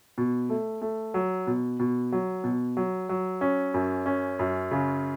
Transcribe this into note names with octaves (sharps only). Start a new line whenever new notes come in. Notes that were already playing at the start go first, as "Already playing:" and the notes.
B2
A3
A3
F#3
B2
B2
F#3
B2
F#3
F#3
C#4
F#2
C#4
F#2
C#3